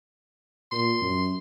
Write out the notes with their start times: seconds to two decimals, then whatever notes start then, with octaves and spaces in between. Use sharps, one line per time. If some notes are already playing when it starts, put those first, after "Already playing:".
0.72 A#2 C6
1.01 F#2